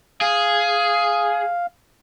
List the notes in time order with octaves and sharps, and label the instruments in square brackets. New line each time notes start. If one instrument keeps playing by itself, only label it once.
[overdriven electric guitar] G#4 [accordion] F5